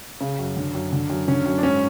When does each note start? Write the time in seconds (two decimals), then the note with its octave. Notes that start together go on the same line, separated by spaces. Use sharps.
0.21 C#3
0.39 F#2
0.57 D3
0.75 F#2
0.92 D3
1.10 F#2
1.28 D3 C#4
1.46 F#2
1.58 D4
1.63 G#2 C#4